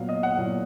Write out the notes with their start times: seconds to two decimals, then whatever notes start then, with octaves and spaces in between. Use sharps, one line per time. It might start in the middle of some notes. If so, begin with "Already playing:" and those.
Already playing: A#2 F#3 B3 F5
0.09 D#5
0.23 F#5
0.37 A#2 F#3 B3